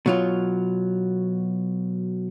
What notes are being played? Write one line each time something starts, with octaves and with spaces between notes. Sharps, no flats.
B2 F#3 F4